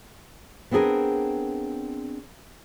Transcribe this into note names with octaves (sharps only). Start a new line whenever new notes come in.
B3 C4 D4 G#4 A#4